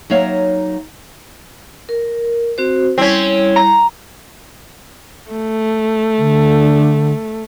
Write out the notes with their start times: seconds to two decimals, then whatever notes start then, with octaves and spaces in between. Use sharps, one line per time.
0.10 F#3 A#3 D#4 C#5 E5 F5
1.89 A#4
2.58 C4 F#4 C5
2.98 G3 C4 C#4 E4
3.56 A#5
5.32 A3
6.18 D3